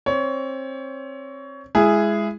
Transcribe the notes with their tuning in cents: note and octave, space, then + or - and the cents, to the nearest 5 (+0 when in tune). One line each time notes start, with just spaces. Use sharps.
C4 +25 C#5 +25
G#3 +0 E4 +20 G#4 +0